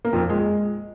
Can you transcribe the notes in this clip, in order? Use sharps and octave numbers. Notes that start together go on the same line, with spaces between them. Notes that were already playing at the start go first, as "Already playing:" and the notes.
A#3
F2
A#2
G#3